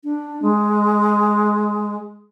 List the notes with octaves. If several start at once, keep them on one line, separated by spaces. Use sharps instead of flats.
D4
G#3